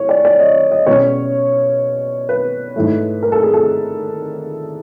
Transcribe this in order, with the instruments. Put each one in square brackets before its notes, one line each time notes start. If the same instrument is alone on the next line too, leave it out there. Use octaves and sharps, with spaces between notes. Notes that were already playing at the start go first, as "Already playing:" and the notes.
Already playing: [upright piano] A2 C#5
D5
D5
D#5
D#5
B2 G#3 C#4 C#5
B4
G#2 E3 A3
A#4
A4
G#4
A4